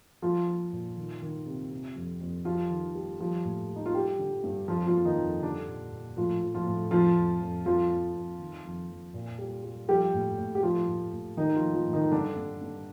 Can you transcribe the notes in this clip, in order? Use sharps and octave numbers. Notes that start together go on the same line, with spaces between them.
F3 F4
F3
A#2
D#3
D#3
C3
C3
F2
F2
F3 G3 F4
D#3
G3
F3 G3 F4
A2
G3
D#4
F4
G3 G4
D3
G2
F2 F3 F4
F3 F4
F2
D#3 D#4
F2
D3 G3 D4
A#2
A#2
A2 F3 F4
F3
F3 F4
A2
F2 F3 F4
F2
F2
F2 F3 F4
F2
F2
D#3
F2
F2
A#2
G3
G3
F3 G3 G4
A2
A2
G4
F3 G3 F4
A2
A2
D#3 G3 D#4
F3 F4
G3
F3 F4
A2
D#3 D#4
G2 D3 D4
G2
G2